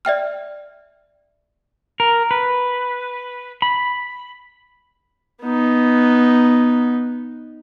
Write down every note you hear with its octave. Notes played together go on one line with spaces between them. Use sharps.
D5 E5 G5 F6
A#4
B4
B5
B3 D#4